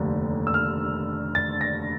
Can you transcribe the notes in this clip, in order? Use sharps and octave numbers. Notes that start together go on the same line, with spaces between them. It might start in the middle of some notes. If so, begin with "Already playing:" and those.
Already playing: F1 D#2 D3
E6
F6
A6
A#6